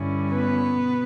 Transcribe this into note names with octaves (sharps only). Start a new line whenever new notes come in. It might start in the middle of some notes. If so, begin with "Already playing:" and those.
Already playing: G2 D3 G3 C#4 E4
B3 B4
B2